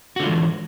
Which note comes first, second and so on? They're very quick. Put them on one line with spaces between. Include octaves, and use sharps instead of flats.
F#4 D3 F4 G#3 E3